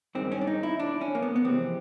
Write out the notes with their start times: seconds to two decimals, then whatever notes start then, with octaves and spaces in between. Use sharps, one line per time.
0.15 G2 D#3 G#3 C4
0.32 C#4
0.41 D4
0.47 D#4
0.63 E4
0.79 D4
1.01 C#4
1.15 A#3
1.23 B3
1.36 B3
1.44 F2 C3 E3 G#3 C4